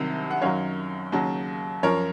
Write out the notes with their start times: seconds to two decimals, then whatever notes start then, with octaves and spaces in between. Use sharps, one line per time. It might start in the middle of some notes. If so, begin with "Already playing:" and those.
Already playing: C2 C3 D#3 F#3
0.31 F#5
0.42 F#2 D#3 F#3 C#5 F5
1.12 D#2 C#3 F#3
1.83 F#2 F3 A#4 C#5